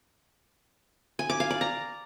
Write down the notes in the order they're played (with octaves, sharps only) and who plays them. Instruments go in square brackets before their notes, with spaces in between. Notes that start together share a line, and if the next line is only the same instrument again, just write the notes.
[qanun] G#5
D6
F5
D5
A#5